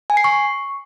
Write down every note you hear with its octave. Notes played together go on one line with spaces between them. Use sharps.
G#5
C7
C#6